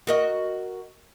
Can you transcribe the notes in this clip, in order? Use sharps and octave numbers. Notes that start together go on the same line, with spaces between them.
F#4 A#4 D#5